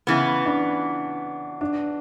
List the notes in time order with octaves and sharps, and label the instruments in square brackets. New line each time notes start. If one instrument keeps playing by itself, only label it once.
[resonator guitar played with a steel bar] C#3 E3 B3
[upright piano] D4
D4